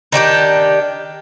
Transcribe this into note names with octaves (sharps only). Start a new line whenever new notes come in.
D#3 D4 F#4 G4